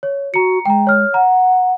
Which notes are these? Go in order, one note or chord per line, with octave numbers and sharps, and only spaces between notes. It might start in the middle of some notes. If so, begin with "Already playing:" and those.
C#5
F#4 A#5 C#7
G#3 G5 A#5
C#5 F6
F#5 A#5